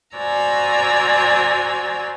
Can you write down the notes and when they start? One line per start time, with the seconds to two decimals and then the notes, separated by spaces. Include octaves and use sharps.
0.17 F#4 C5 D5 G#5 A#5 E6